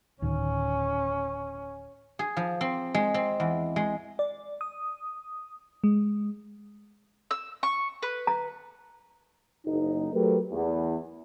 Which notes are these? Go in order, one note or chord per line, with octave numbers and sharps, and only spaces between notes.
D1 D#3 C#4
G#4
F3
C4
G#3
C4
E2
G#3
D5
D#6
G#3
E6
C#6
B4
A#5
F#1 D#4
F#3 A3 G4 A#4 B4
E2